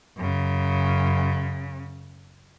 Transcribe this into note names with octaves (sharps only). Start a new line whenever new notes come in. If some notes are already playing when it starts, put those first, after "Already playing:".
F#2 C#3